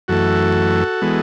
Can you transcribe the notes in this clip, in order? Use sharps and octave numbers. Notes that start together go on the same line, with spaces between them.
F#2 E3 A3 F#4 A4
E3 G#3 B3